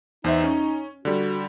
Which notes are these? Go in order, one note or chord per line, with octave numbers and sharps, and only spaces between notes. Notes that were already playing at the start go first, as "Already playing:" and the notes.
E2 D#4 C5 E5
C#4
D3 G3 F#4